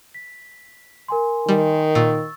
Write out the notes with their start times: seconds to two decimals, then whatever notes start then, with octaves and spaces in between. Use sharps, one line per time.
0.14 B6
1.08 A#4 G#5 C6
1.49 D#3 G3
1.95 A#2 C#6 E6 A6